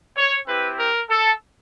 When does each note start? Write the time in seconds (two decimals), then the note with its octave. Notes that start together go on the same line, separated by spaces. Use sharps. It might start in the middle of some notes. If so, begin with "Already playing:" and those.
0.17 C#5
0.47 C4 E4 G4 B4
0.79 A#4
1.10 A4